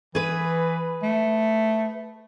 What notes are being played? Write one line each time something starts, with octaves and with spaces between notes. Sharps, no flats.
E3 G#4 B4
A3